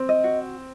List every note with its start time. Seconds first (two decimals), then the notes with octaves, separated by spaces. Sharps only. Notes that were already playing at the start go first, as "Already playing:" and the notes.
Already playing: C4
0.09 D#5
0.24 F#4